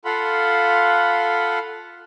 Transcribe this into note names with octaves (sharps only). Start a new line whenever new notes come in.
F4 A4 F5 F#5 B5 C6